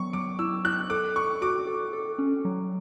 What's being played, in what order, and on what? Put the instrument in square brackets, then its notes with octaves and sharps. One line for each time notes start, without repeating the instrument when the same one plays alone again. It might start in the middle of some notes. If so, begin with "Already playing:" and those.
Already playing: [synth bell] F#3 B3 [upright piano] C#6
[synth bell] F#3 [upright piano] D6
[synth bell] E4 [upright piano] E6
[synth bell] E4 [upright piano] F#6
[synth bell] A4 [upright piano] D6
[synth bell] A4 [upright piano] C#6
[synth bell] F#4 [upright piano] D6
[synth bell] A4
A4
C#4
F#3